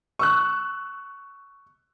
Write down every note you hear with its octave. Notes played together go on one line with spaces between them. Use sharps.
C#6 E6 F#6